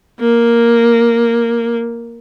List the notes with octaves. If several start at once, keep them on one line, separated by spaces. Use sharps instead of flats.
A#3